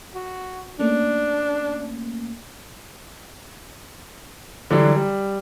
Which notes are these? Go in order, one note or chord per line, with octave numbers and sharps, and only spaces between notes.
F#4
A3 A#3 C#4 D4
D3 E3 F#3 G3 D4
G3